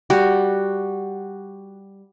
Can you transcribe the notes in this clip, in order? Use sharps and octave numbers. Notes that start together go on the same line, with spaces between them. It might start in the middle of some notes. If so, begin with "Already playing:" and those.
G3 F#4